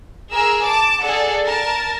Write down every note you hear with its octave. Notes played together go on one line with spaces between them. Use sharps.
G#4 A#4 E6
A5 D6
G#4 A4 D5 F#5
A#4 A5